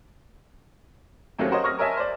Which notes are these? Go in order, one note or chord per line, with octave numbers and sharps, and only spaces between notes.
D#2 F#3 A3 A#3 C4 C#4
F#4 A#4 C5 C#5 D#5
C#6 D#6 F6 A#6
A#4 C#5 D#5 E5 G#5 A5
C5 D5